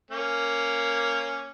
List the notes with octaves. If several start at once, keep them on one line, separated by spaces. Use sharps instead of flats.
A#3 C#4